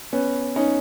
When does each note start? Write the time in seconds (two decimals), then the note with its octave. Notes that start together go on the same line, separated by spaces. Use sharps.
0.13 B3 C#4
0.56 C#4 D#4